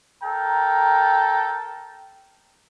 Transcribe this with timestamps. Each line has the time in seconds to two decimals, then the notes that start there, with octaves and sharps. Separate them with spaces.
0.23 A4 A#4 G5 A#5